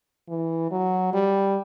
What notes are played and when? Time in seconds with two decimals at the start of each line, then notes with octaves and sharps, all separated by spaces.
0.28 E3
0.71 F#3
1.13 G3